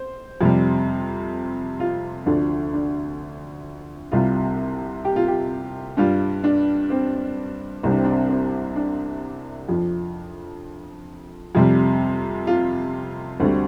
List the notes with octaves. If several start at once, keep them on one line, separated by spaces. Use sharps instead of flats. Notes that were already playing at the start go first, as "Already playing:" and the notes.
Already playing: C5
F2 C3 G3
F4
D2 D3 F3 D4
D4
C2 C3 G3 F4
G4
F4
G4
G2 G3 F4
D4
C4
C2 C3 G3 C4
D4
C4
D4
C4
C4
D4
F2 F3
F2 C3 G3
F4
D2 D3 G3 C4